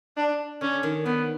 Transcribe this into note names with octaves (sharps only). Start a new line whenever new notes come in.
D4
D3 C#4
D#3
D#3 B3